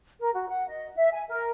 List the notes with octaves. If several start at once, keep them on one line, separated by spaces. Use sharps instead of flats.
A#4
F#4
F#5
D#5
E5
G#5
A#4